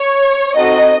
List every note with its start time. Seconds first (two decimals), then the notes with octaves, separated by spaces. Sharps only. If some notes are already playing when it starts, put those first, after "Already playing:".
Already playing: C#5
0.56 C4 D#4 F#4 A4 D#5